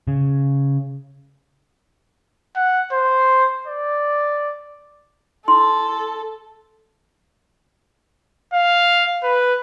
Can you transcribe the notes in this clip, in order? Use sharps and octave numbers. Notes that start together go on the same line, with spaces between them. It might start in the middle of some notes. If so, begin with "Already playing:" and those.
C#3
F#5
C5
D5
E4 A4 C6
F5
B4